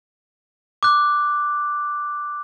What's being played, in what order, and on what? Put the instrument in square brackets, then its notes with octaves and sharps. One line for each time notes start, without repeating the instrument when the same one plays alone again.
[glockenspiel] D6 F#6